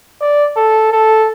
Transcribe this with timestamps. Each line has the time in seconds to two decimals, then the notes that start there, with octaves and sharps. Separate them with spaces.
0.21 D5
0.57 A4
0.92 A4